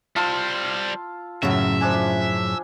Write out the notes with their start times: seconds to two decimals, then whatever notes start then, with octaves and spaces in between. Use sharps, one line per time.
0.16 G3 F4 C5 A5 E6
1.43 F#2 A2 C#3 E5 A#5
1.81 F3 D4 G#5